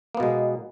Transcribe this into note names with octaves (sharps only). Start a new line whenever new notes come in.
B2 G#3 A#3 B3